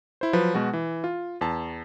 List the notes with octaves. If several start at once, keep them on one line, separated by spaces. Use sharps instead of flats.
E4 C5
F3 F#3 B4
B2 G#3 F#4
E3
F4
E2 A5